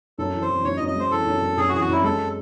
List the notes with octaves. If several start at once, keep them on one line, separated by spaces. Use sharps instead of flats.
F#2 A4
E3
C5
E3
F#2 C#5
D#5
F#2
D#5
G#3 C5
E3 A4
F#2
F#2
F#2 G#4
F#4
E3 G#4
F#4
F#2 E4
G#3 A4